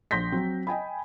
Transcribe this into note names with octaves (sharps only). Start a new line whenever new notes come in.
A#1 C6 G6 A#6 B6
F#3 C4
D#5 G5 G#5 B5